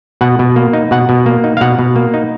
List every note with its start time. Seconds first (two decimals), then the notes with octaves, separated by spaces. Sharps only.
0.21 B2 F#5
0.39 B2
0.56 A#3
0.73 D#4
0.91 B2 F#5
1.09 B2
1.26 A#3
1.44 D#4
1.57 F5
1.61 B2 F#5
1.79 B2
1.96 A#3
2.14 D#4